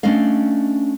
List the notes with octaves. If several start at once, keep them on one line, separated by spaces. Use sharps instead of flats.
A3 C#4 D4 D5 D#5 F5